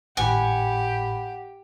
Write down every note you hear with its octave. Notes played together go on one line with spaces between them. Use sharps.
G#1 A2 G4 F#5 G#5 B5